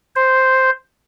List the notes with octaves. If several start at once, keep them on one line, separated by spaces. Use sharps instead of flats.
C5